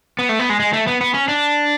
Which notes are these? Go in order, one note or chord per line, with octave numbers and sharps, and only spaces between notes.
B3
A3
B3
G#3
G#3
A3
B3
B3
C#4
D4